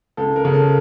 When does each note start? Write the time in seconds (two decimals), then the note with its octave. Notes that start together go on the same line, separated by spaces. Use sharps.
0.17 C#2 A4
0.36 A#4
0.45 C#3
0.54 A4